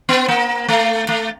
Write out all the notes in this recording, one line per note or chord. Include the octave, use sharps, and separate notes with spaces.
B3
A#3
A3
A3